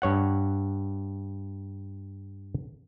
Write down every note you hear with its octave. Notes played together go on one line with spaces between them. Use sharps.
G2 C#5 F#5